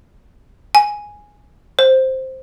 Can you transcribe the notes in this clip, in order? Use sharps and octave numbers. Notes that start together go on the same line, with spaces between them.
G#5
C5